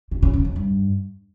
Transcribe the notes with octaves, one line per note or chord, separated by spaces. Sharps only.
C#3
C#3
F2
F2
G2